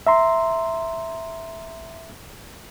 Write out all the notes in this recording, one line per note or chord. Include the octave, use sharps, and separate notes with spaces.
E5 A#5 C6